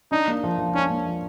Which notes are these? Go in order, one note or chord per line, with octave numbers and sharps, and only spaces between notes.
D4 D#4
A#3
F3
F3
C#4 D4
A#3
F3